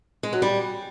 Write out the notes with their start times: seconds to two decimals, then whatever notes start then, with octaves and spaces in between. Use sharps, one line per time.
0.23 G#3
0.33 F#3
0.42 G3